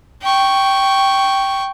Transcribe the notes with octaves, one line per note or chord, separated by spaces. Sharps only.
G5 C#6